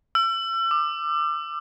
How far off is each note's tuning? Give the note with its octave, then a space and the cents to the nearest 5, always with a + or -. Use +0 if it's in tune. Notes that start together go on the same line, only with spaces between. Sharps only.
E6 +35
D6 +25